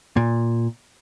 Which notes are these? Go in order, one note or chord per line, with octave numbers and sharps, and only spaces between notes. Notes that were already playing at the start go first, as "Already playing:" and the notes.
A#2